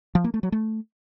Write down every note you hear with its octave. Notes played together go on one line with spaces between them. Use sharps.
F3
A#3
A3
F#3
A3